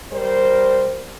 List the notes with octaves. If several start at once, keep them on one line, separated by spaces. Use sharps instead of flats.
G3 A#4 C5